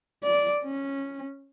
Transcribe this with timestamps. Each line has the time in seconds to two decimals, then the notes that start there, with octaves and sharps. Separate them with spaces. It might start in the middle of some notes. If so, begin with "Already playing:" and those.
0.24 D5
0.63 C#4